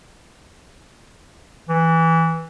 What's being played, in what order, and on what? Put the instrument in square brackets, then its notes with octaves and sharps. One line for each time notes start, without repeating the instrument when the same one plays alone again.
[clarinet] E3